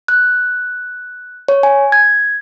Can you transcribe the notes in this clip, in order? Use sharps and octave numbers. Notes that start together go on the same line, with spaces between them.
F#6
C#5
G#5
G#6